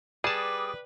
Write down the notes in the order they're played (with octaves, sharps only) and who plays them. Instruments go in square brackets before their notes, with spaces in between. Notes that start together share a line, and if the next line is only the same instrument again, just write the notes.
[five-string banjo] G3 [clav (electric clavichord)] G#4 A5 [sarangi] B4 [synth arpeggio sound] D6 D#6